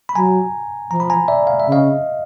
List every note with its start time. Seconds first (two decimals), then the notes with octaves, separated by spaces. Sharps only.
0.09 B5
0.16 F#3 G#5 A#5
0.91 F3 A#5
1.00 B5
1.10 G#5 A#5
1.28 D5 E5
1.47 F5
1.60 E5
1.66 C#3
1.72 D#5 F5